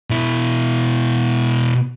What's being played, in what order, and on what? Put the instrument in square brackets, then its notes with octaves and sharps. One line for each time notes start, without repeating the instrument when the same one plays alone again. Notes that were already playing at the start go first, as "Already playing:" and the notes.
[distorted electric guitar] B2 E4